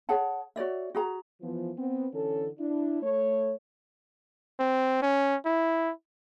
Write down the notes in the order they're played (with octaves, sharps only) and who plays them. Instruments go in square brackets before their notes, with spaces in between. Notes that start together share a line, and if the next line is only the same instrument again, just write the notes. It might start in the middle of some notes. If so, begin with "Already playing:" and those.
[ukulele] G#4 C#5 F#5 A5
F#4 C#5 D5 E5
F#4 G#4 A#5
[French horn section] E3 F3 B3
B3 C4
D3 E3 C#4 A4
D4 E4
A3 C#5
[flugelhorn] C4
C#4
E4